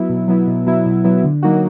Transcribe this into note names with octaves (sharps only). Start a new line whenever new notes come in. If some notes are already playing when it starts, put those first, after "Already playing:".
Already playing: F#3 B3 E4
B2
F#3 B3 E4
B2
F#3 B3 E4
B2
F#3 B3 E4
D3
F#3 A#3 D#4 F#4